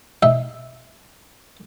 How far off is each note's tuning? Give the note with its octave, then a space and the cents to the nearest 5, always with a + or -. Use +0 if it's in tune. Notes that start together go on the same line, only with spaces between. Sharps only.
D#4 +0 E5 -10